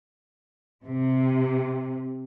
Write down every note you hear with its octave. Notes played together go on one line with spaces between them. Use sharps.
C3